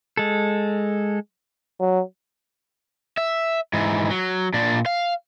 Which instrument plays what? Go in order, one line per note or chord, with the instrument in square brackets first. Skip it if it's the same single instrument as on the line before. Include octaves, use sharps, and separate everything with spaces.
[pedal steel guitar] G#3 A4
[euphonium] F#3
[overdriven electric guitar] E5
G#2 E3
F#3
A#2 D4
F5